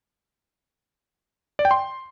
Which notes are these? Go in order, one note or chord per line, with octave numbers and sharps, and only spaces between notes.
D5
G5
C6